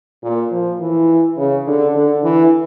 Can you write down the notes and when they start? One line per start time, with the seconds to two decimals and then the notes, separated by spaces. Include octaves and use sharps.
0.23 A#2
0.51 F3
0.80 E3
1.37 C#3
1.67 D3
1.95 D3
2.23 E3